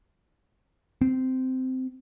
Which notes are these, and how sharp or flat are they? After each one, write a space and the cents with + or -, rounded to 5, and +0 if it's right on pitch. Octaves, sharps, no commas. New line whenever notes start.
C4 -15